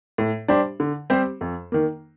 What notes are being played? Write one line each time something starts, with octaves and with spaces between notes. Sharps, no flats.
A2
G3 D4 G4 C5
D3
G3 C4 G4 C5
F2
D#3 A#3